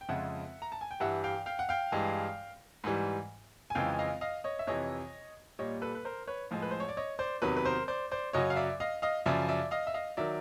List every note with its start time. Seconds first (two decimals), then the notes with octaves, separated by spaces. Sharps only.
0.01 G5
0.09 F2 C#3 F3 G#3 E5 F#5
0.62 A#5
0.72 A5
0.81 G#5
0.91 G5
1.00 G2 E3 G3 E5 F#5
1.24 F5 G5
1.46 F5 G5
1.59 F#5
1.69 F5 G5
1.92 G2 E3 G#3
2.84 G#2 E3 G3
3.70 G#5
3.75 F2 C#3 E3 G#3 F5 G5
3.99 D#5 F5
4.21 D#5 F5
4.44 C#5 D#5
4.59 E5
4.67 F2 C3 E3 C#5 D#5
5.59 A#2 G3 C#5 D#5
5.81 A4 B4
5.95 B4
6.05 A#4 C5
6.27 B4 C#5
6.51 A2 F3 G#3
6.62 B4
6.71 C5
6.80 C#5
6.89 D5
6.97 C#5 D#5
7.19 C5 D5
7.42 E2 C3 D#3 F#3 B4 C#5
7.56 B4
7.65 A#4 C5
7.88 C5 D5
8.11 C5 D5
8.33 F#2 C#3 F#3 C#5 D#5
8.50 F5
8.56 D5 E5
8.80 D#5 F5
9.02 D#5 F5
9.26 F#2 C#3 F3 D5 E5
9.48 D5 E5
9.71 D#5 F5
9.87 E5
9.94 D#5 F5
10.17 D#3 F#3 D5 E5